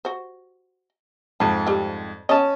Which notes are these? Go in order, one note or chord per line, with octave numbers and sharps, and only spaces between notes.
F#4 C5
F2 G#2 A5
G3 C4
C#4 D#5 A5